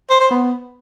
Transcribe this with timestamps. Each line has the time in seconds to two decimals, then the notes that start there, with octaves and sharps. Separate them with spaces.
0.10 C5
0.20 C5
0.31 B3